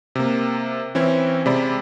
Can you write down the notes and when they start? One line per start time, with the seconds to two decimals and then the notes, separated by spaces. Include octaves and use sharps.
0.15 C3 A#3
0.95 E3 C4 C#4 E4
1.46 C3 G#3 D5 B5